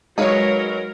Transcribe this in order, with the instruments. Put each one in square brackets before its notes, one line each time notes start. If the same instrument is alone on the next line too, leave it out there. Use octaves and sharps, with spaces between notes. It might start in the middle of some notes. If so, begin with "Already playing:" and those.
[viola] F#3 A#4 [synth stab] G#3 C#5 [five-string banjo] D#4 B4 F5